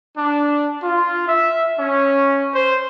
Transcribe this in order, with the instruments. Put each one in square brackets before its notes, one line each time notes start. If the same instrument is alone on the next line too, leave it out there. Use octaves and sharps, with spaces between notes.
[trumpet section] D4
F4
E5
C#4
C5